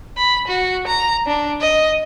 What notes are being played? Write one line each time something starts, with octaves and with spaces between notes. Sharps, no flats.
B5
F#4
A#5
D4
D#5